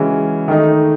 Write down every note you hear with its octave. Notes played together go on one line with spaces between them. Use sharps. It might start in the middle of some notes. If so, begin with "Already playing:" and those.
Already playing: C#3 E3 G#3 C#4 F#4
D#3 A3 D#4